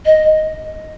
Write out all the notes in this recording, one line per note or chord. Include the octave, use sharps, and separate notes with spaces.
D#5